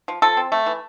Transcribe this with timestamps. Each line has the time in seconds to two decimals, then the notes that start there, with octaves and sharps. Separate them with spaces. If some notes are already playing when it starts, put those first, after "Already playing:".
0.08 F3
0.22 F3 A4
0.37 C4
0.52 A3
0.66 E3